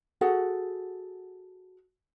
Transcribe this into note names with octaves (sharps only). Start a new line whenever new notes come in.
F#4 G#4 A4 F#5